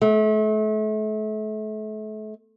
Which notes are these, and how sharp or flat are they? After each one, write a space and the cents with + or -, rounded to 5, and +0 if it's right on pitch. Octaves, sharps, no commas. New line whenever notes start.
A3 -35